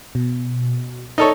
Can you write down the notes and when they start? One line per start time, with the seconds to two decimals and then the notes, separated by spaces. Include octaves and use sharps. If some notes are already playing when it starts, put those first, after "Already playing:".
0.15 B2
1.18 D#4 A4 C#5 D5